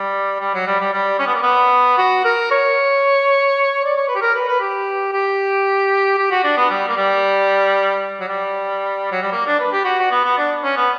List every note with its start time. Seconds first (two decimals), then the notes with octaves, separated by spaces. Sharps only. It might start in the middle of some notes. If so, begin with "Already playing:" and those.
Already playing: G3
0.40 G3
0.55 F#3
0.67 G3
0.80 G3
0.93 G3
1.19 C#4
1.27 B3
1.35 A#3
1.43 B3
1.98 F#4
2.25 A#4
2.51 C#5
3.85 D5
3.96 C#5
4.08 B4
4.15 G4
4.22 A#4
4.34 B4
4.48 B4
4.61 G4
5.12 G4
6.18 G4
6.31 F#4
6.44 D4
6.57 B3
6.70 G3
6.88 A#3
6.97 G3
8.20 F#3
8.28 G3
9.12 F#3
9.22 G3
9.32 A#3
9.46 D4
9.59 B4
9.73 G4
9.85 F#4
9.99 F#4
10.11 B3
10.24 B3
10.38 D4
10.64 C#4
10.77 B3